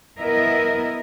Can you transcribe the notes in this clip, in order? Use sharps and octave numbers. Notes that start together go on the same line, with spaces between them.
B3 E4 A#4 D#5 E5